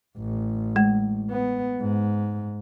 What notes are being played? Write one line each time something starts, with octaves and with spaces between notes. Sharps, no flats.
A1
G#3
B3
G#2